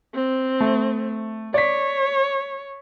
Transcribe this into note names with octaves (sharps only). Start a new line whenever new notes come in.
C4
A3
C#5 D5 B6